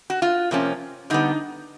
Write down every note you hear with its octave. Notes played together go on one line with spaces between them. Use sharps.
F#4
F4
C3 F3 A#3 C#4
D3 G3 B3 D#4